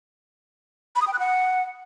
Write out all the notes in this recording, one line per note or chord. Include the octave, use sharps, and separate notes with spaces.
B5
D#6
G5
F#6
F#5